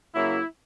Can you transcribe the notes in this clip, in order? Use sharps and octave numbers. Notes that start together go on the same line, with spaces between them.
C#3 F#3 A#3 E4